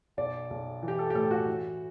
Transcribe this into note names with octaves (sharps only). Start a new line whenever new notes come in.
B1 D5
B1
E3
G4
A4
G4
A2 A4
F#4
E3